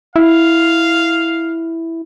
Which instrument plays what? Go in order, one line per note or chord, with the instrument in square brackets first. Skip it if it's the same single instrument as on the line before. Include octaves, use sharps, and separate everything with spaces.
[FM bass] E4 [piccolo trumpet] F5